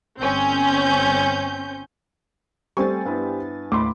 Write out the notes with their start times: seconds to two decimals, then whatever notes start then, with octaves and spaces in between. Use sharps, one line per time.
0.19 G1 C4 C#4 G6
2.77 G3 A3 C4 C5 G#5 C#6 A6
3.05 G2 B3 E4
3.72 D#2 A2 A3 B5 C6 D6